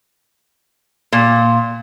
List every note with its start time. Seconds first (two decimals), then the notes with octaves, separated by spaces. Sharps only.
1.12 A#2